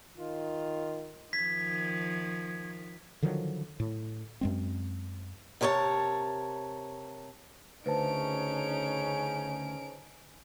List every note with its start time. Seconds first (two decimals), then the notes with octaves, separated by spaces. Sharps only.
0.17 D#3 F4
1.33 D#3 F3 G#6 B6
3.22 D3 D#3 F3 F#3
3.80 A2
4.41 F#2 G#3 C4
5.61 C3 A#4 C#5 D#5 A5
7.86 D2 C#3 C#4 D#4 B4 C5 A5 D7